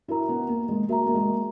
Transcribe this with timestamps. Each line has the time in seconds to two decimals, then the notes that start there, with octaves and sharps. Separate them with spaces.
0.08 E4 F#4 A#4 E5 A#5
0.29 B3
0.48 A#3
0.69 G#3
0.89 A#3 F#4 A#4 E5 A#5
1.06 A#3
1.14 G#3